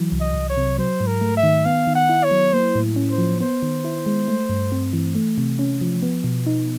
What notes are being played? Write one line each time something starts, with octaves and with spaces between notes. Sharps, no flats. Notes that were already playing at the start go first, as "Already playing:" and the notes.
Already playing: E3 F#3
C2
D#5
C2
C#5
C3
F#3 C5
G#2
A#4
A3
E5
D#3
B3 F5
D#3
F#5
E4
C#5
F#3
A#3 C5
A2
C#4
C5
F3
B3 C5
D#3
E4
G#3
A3
G2
C4
E3
A3
C3
C#4
F3
B3
B2
D#4